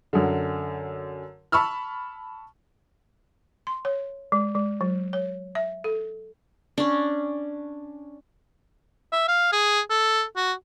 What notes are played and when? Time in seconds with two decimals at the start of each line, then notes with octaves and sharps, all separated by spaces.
0.13 F#2 D3
1.52 A5 B5 C#6 E6 F6
3.67 C6
3.85 C#5
4.32 G#3
4.55 G#3
4.81 F#3
5.13 C#5
5.55 E5
5.84 A4
6.78 C#4 D4
9.12 E5
9.28 F5
9.52 G#4
9.90 A4
10.37 F#4